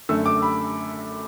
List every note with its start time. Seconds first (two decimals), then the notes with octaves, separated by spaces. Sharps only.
0.09 F#2 D3 A3 E6
0.26 D6
0.42 B5